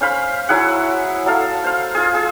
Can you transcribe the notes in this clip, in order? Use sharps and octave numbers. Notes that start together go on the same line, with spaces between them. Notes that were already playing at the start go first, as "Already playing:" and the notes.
C#4 C5 F5 B5
F#3 E4 G#4 F#5
F#3 A4 F5
C5 F5
F4 G#4
G#4